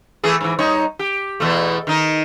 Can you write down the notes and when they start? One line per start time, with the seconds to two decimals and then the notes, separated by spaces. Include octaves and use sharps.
0.24 E3 A3 G#4
0.41 G#2 E3
0.59 G3 D#4 C#5
0.99 G4
1.40 E2 B2 A3
1.87 D#3 D#4